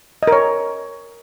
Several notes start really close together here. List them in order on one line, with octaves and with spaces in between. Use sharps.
D#5 A#4 C#5